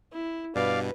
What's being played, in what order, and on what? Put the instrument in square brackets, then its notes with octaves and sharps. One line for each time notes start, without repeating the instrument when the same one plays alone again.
[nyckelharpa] E4
[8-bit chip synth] G2 B2 [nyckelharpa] B4 [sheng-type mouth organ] D5 F5